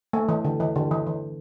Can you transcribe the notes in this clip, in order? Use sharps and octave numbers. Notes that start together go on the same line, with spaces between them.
A3
E3
D3
E3
D3
E3
E3